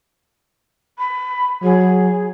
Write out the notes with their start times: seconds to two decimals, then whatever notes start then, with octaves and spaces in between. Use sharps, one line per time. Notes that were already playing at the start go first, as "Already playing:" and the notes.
0.98 B5
1.63 F#3 G#4